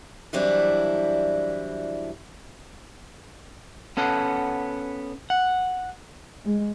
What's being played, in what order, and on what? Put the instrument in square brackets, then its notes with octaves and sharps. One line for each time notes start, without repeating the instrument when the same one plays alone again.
[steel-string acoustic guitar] E3 F#3 G3 C4 D4 E4
[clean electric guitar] B3 C#4 A4 F#5
F#5
[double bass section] G#3